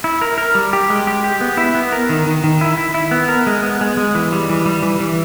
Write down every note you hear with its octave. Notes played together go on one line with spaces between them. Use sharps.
E4
A#4
A#4
G3
G4
G#3
G4
G4
B3
E4
B3
A#4
D#3
D#3
D#3
E4
E4
E4
B3
A#4
G#3
B3
G#3
G#3
E3
G3
E3
G3
E3
E3